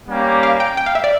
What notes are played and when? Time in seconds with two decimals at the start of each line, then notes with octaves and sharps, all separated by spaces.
0.08 G3 A#3 C#4 G4
0.43 F5
0.60 G5
0.77 G5
0.86 F5
0.95 E5
1.04 D5